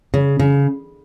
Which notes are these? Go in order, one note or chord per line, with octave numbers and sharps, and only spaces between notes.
C#3
C#3